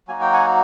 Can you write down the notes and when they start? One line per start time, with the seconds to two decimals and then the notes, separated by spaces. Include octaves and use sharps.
0.08 F#3 A#3 D#4 F#4 G#5
0.21 G5
0.33 F#5 G#5